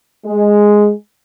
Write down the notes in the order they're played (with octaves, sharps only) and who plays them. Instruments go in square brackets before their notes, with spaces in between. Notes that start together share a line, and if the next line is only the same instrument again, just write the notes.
[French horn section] G#3